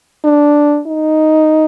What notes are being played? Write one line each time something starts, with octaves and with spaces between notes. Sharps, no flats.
D4
D#4